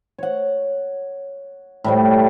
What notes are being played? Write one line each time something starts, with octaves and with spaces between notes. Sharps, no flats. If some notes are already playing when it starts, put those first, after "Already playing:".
C#5 F#5
A2 G3 A3